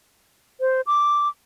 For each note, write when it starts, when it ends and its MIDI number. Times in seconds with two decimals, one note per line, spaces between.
0.60 0.81 72
0.87 1.28 86